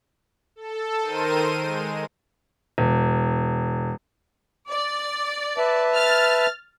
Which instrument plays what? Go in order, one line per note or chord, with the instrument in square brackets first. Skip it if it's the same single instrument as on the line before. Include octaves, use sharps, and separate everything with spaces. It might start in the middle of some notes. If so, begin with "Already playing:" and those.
[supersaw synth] A4
D#3 A#4 C5 D#7
G#3
[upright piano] E1
[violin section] D5
[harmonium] B4 E5 A5
[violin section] F6 A6